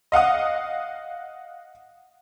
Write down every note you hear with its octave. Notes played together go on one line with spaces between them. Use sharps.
D#5 F5 F#5 D#6